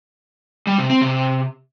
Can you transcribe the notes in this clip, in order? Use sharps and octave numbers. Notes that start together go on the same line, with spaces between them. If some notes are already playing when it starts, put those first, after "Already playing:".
G3
C3
C4
C3